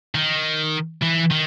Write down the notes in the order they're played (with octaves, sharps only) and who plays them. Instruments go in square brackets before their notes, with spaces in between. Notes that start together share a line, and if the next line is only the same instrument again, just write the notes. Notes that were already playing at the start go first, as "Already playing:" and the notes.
[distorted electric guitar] D#3
E3
D#3